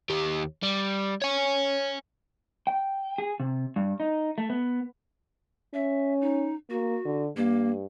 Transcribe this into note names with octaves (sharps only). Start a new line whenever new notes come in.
D#2 G4
G3
C#5 G#5
G5
G#4
C3
G2
D#4
A3
B3
C#4 E5
D#4
A#3 F#4
D3
G2 A#3